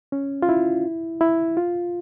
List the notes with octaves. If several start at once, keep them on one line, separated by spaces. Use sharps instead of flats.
C#4
F4
E4
E4
F4